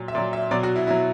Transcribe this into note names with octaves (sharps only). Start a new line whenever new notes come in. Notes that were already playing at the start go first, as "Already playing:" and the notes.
Already playing: A#2 F#3
E5
A#2 F#3 D5
E5
B2 F#3 D5
F#4
E4
B2 F#3 E4